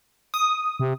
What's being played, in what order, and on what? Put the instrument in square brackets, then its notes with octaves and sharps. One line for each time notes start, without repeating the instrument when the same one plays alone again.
[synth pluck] D#6
[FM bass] C3